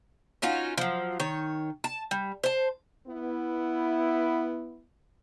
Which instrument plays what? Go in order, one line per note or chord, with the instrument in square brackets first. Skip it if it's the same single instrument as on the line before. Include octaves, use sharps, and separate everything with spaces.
[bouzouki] C#4 D#4 F4 F#4
F3 F#3
D#3 C#5
A5
G3
C5 A5
[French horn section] B3 E4